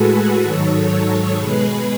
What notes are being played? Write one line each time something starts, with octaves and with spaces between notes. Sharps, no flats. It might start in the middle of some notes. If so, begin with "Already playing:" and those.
Already playing: A2 G#3 F#4 G#4 A4 B4
G#2 D#3 F#3 A4 C#5
B2 G#3 G#4 B4